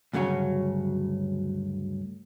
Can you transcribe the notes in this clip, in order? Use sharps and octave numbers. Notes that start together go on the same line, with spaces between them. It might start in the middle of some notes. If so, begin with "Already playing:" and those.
D2 G2 C#3 F#3 C#4